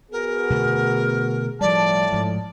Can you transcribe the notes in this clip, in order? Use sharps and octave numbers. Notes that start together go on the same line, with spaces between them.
B3 F#4 G#4 A#4
B2 D3 A3
A2 F3 G3 D5 A5
G#2 F3